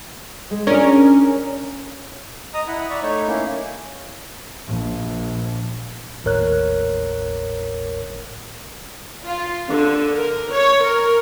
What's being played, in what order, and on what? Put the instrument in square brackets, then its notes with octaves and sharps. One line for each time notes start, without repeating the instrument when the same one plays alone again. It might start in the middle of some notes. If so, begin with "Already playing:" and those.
[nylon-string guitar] G#3
[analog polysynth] C#4 A#4 [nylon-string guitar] D4 F4 G#4
[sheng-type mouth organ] D#5 A#5 D#6
E4 F#5 B5
D5 E5 A#5 B5 C#6
A3 D#4 C#5
A#3 C#4 E4
[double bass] A#1
[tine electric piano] G#1 D#2 A2 A#4 C#5 F#6
[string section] F4
D3
A#4
C#5
A#4